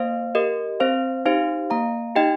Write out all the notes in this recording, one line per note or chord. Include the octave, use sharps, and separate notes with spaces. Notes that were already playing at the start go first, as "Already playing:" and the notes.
Already playing: A#3 C5 F5
G4 A#4 D#5
C4 C5 F5
D#4 G4 C5 F5
A#3 F5 A#5
D#4 G4 D#5 G5